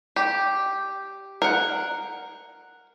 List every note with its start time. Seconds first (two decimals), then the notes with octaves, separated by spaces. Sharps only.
0.16 G4
1.42 A#4 F#5